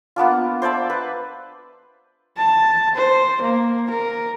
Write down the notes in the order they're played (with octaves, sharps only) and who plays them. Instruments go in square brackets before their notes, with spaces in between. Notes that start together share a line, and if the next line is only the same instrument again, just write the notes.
[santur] A#3 B3 D4 F4
C5 D5 E5 A5
B4
[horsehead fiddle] A5
C5
A#3
A#4